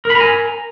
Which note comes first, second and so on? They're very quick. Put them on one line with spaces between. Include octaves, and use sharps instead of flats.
A#4 B5 A#5 G#5